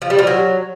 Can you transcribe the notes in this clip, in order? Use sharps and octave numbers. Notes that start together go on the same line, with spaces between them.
F3
G3
F3
F#3